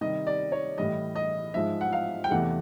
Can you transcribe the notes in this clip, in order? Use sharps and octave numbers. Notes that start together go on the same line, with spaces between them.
C3 D#3 G3 D#5
D5
C#5
A2 E3 G3 D#5
D#5
G#2 F3 G#3 E5
F#5
F5
G5
E2 C3 E3 A3 F#5